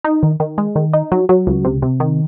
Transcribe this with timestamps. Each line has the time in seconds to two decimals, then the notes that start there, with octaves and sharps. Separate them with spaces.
0.04 D#4
0.23 D#3
0.40 D#3
0.58 G#3
0.76 D#3
0.93 D#4
1.12 F#3
1.29 F#3
1.47 C#2
1.65 C3
1.82 C3
2.00 D#3